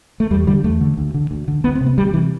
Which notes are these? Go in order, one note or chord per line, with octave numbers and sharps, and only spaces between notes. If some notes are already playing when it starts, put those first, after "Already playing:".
A3
E2 G3
D3 G3
E2 A3
D3
D2
D3
D2
D3
D2 B3
C4
C3
B3
D2 G3
C3 E3